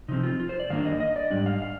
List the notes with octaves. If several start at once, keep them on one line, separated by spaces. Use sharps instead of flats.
C3 F3 C4 D#4
F4
F4
C5
D5
G2 D#3 A#3 D4 F5
D#5
D#5
D5
G#2 G3 D4 D5
F5
F5